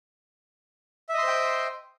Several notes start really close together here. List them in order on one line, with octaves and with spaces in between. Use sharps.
E5 D#5 C6 C5 G5